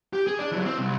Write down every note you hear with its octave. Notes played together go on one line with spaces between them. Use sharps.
G4
G#4
D4 D5
E3 F#3
C4
C2